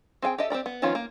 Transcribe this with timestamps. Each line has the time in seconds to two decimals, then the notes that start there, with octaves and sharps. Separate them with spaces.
0.22 C4 G#4 F5 G5
0.38 G4 A4 D#5 E5
0.50 C4 G4 A#4 D5
0.66 B3
0.82 D#3 F3 B3 C#4 F4
0.95 A#3